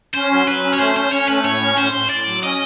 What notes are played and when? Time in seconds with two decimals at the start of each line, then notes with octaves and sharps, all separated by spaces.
0.15 C#4 C5
0.31 F#3
0.48 F#3 B4
0.64 C#4
0.73 C#5
0.80 A3 C5
0.96 C#4 C5
1.12 C#4 C#5
1.28 A3 B4
1.45 A2 C#5
1.61 C#4
1.77 A2 C5
1.94 A2
2.10 A2 D5
2.27 F#3
2.43 C#4 D#5